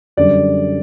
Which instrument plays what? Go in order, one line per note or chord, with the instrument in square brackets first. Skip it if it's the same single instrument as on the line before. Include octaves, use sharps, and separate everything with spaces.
[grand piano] F#2 D3 G3 D5